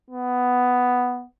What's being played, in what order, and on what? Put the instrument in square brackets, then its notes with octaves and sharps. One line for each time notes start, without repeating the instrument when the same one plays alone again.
[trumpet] B3